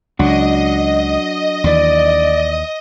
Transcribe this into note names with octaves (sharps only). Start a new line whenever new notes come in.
C#2 F#3 D4 F#4 D#5
D#2 E3 D5